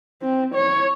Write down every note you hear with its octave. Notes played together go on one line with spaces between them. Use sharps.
C4
C#5